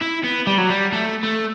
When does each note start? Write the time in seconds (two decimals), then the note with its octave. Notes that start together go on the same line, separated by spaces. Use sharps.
0.01 E4
0.24 B3
0.47 G3
0.58 F#3
0.70 G3
0.93 A3
1.23 A3